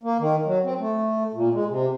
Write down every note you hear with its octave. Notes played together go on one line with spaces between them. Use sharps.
A#3
D#3
F#3
C4
A3
A#2
G#3
C3